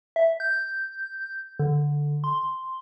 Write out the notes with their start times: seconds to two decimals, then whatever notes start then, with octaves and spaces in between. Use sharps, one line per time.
0.16 E5
0.40 G6
1.59 D3
2.24 C6